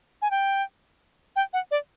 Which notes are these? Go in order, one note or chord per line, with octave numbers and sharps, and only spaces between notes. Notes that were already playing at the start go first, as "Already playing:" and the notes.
G#5
G5
G5
F#5
D5